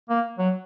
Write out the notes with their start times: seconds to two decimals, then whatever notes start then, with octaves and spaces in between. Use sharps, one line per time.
0.10 A#3
0.38 F#3